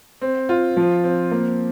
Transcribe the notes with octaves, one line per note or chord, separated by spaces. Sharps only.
C4
F4
F3
C4
A#3